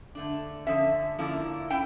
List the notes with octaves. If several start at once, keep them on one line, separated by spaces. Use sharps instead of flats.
D3 A3 D4
D3 F3 C#4 E5
D3 F3 A#3 C#4 E4
C#4 E4 G5